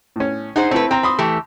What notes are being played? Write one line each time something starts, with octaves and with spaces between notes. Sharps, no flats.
A2 C#4
D#4 G#4 C5 F#5
A3 C4 E4 B4
C4 G5 A#5
B5 C6 D#6
E3 A3 G4